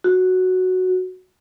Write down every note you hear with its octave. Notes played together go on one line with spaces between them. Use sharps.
F#4